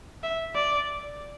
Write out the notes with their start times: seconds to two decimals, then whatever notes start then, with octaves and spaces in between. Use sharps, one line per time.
0.23 E5
0.55 D5